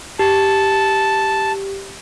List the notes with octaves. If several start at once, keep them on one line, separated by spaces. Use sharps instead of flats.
G4 A5